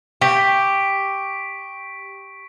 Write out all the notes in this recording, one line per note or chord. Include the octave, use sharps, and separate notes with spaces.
G4 C#6 B6 D7